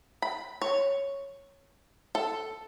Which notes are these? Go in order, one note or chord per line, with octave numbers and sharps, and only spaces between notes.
B5
C#5
A4